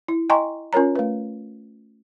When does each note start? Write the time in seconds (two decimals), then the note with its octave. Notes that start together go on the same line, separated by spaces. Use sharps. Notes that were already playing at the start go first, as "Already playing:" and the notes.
0.08 E4
0.30 D#5 G5 G#5 A#5 C6 C#6
0.73 C#4 F4 A#4 C#5 A#5
0.95 A3 B4